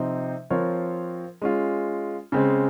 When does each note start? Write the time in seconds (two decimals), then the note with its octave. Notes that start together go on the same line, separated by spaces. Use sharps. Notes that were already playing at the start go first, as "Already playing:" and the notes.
Already playing: C3 F3 C4 D#4
0.50 F3 C4 F4 A#4 C#5
1.42 G#3 C#4 F4
2.32 C#3 G#3 C4